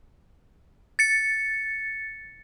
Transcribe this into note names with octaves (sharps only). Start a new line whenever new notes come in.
A6 C#7